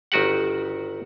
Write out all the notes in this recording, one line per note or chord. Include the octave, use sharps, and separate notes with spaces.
G1 D#3 F#4 G4 F#5